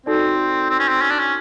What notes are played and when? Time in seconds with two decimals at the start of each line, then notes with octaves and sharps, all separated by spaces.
0.06 C4 D#4 F#4 A4 D5
0.70 C4
0.79 C#4
0.88 C4
1.01 C#4
1.10 D4
1.19 C#4